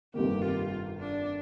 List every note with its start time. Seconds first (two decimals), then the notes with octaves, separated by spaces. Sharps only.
0.14 G1 F2 C3 D#3 A#3 G4
0.42 F4
0.99 D4